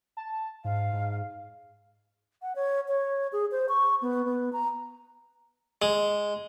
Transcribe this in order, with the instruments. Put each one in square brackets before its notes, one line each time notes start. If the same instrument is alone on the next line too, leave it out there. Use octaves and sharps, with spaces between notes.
[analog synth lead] A5
[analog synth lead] G#2 [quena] F5
[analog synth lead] G#2
[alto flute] F#5
C#5
C#5
G#4
C5
C#6
B3
B3
A#5
[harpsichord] G#3